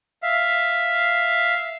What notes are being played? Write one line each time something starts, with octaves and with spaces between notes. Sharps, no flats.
E5 F5